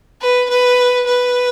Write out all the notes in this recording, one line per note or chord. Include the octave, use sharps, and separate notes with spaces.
B4
B4
B4